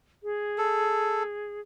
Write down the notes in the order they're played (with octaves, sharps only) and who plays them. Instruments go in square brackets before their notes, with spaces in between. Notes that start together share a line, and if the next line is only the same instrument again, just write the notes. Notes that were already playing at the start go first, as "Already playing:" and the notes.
[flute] G#4
[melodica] A4